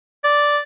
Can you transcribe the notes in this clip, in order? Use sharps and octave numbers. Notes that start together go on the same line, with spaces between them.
D5